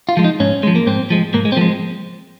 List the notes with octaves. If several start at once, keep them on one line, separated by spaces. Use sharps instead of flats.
F4
F3 G#3
D#4
G#2 C#4
F3 G#3
A#3
G#2 C4
F3 G#3
G#2 A#3
G#3
C4
F3 G#3 A#3